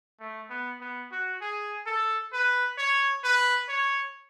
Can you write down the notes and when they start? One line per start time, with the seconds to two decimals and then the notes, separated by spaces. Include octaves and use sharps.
0.20 A3
0.50 B3
0.80 B3
1.11 F#4
1.41 G#4
1.87 A4
2.33 B4
2.78 C#5
3.24 B4
3.69 C#5